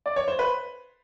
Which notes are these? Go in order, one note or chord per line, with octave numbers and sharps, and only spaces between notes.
D5
C#5
C5
B4